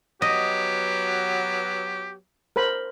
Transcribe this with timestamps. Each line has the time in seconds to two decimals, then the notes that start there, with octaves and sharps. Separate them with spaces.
0.22 F#3 B3 G4 D#5
2.56 A#4 C5 B5